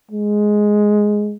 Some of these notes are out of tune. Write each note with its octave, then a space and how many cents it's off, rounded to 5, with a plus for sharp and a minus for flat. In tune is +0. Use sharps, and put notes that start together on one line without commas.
G#3 +5